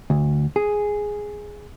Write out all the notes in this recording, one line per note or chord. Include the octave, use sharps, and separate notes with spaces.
D2
G#4